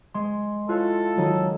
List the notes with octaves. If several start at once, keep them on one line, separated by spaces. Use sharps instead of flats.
G#3 C6
E4 F4 A4 C#5 F5 F#6
D#3 F#3 G#3 D#4